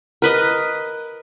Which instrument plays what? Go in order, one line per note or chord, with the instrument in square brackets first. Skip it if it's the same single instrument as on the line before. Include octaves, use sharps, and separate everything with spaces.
[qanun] A#4 B4 D#5